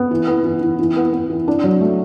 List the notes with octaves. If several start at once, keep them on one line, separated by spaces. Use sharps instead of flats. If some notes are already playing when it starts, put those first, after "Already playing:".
Already playing: B3
E3
B3
E3
E3
E3
B3
B3
E3
D4
F#3
A3